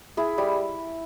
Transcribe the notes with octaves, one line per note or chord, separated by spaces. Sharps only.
E4 G#4
G3